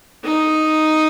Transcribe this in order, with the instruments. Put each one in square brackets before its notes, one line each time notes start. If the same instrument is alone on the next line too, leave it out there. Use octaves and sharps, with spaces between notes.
[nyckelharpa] D#4